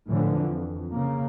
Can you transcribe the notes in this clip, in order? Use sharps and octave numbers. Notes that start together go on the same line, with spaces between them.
A2 D3 E3 F3
F2
C#3 A#3